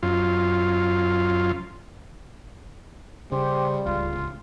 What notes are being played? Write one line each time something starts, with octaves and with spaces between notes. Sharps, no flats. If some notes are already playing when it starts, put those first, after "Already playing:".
F#2 F4
C#3 G3 G4 C5
D1 C#2 C#3 F4